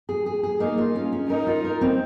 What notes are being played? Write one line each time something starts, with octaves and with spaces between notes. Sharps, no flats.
G#4
G#4
G#4
A#3 D#4
F4
C#4
C#4
D#4 A#4
F4
A#4
C4